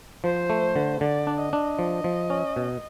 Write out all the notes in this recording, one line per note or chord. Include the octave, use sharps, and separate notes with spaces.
F3 C5
A3
D3
D3 D5
D4
D#5
D4
F3
F3
C#4
B2